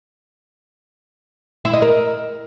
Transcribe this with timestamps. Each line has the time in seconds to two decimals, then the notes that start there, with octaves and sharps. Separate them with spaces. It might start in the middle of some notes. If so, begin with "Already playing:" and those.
1.65 E4
1.73 D#5
1.82 A#4